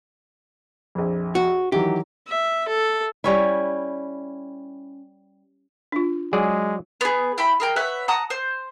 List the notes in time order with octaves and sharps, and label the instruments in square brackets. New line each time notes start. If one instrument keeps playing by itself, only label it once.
[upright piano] A#1 F2
[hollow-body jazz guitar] F#4
[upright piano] D#3 E3 F#3 [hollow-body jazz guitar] G4
[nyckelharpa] E5
A4
[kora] G3 C#4 E4
[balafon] D4 F4
[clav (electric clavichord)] F#3 G#4 D5 [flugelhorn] G#3
[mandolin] B3 G#4
E4 G5 B5
G#4 A#4 G5
B4 C#5 E5 F#5
F#5 A5 A#5 D#6
C5